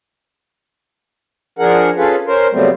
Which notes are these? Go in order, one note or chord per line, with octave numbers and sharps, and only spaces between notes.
F3 D4 G#4 A#4 F#5
C#4 F4 G#4 A4 B4
C#4 A#4 C5
C#3 F#3 G3 A3 B3 C4